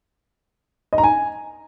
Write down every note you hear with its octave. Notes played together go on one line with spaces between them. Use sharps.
D#5
A#5
G#5